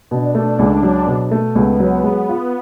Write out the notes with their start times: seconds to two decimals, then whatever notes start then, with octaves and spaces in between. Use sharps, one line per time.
0.11 B2 D4
0.35 A3
0.59 C#2 D4
0.83 F#3
1.07 B2
1.31 A3
1.55 C#2 B3
1.80 F#3
2.04 G#3 B3
2.29 F4